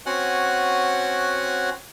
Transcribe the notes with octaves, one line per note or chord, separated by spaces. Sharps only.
C4 C#4 F#4 F#5 G#5 F#6